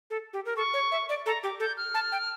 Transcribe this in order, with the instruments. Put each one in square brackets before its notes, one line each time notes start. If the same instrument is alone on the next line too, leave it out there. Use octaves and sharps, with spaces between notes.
[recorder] A4
G4
A#4
[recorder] A4 [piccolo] C#6
[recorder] C#5
E5
D5
[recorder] A4 [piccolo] A#5
[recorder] G4 [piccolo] D6
[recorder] A4 [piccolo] G6
[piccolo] F6
[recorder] A5
G5